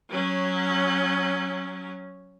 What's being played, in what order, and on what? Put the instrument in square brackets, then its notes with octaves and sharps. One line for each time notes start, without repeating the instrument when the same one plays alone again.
[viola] F#3 C#4